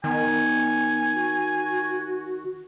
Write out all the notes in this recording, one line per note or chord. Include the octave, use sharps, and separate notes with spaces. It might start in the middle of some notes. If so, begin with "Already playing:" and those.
D#3 B3 G#5
F#4